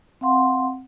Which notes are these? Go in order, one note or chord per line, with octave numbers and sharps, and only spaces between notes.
C4 F5 F#5 C6